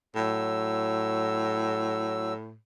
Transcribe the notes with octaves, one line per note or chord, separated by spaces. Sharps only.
A2 F#3 E6